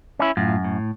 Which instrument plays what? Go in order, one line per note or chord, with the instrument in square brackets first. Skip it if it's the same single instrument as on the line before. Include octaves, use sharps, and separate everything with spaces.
[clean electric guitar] C#4 E4
[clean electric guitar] F#2 [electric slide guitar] A2 F4
[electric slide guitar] A2